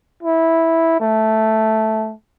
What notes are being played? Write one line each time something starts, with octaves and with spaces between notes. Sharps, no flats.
E4
A3